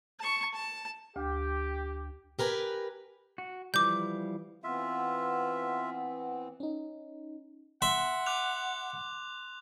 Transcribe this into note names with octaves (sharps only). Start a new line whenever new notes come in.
A5 C#6
A5
D2 G4
G4 A#4 B4 G#5
F#4
E3 F3 G3 D6 G6
E3 B3 C4 F4 E5
C#4 D#4
E5 F#5 C6
D6 F#6 F7